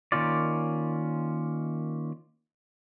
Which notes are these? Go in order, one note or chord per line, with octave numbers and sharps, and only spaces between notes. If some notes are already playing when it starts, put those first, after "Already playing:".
D#3 F3 A#3 C#4 F4 D5